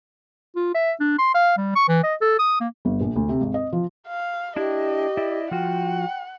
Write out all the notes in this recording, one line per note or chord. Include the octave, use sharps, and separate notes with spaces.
F4
E5
D4
C6
F5
G3
C#6
E3
D#5
A4
D#6
A#3
G1
A#1
D2
C3
G#1
D#5
F3
F5
D4 E4 G4 D#5
E4 D5 E5
F3 F4 F#4 F#5 G5